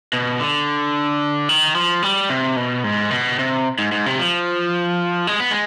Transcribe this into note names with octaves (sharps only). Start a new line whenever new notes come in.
B2
D3
D#3
F3
G3
C3
B2
G#2
B2
C3
G#2
G#2
C3
F3
G#3
B3
G#3